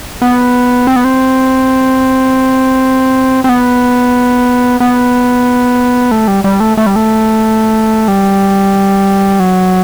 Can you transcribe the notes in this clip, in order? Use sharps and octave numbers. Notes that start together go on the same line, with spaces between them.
B3
C4
B3
C4
C4
B3
B3
A3
G3
G3
A3
A3
G3
A3
G3
F#3